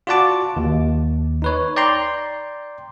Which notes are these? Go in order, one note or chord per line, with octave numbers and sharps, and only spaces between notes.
F4 F#4 D5 F#5 A5 D6
D#2
D#4 B4 C#5
D5 G5 A#5 C6